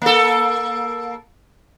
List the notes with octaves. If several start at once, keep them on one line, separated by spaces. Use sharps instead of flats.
A#3 A4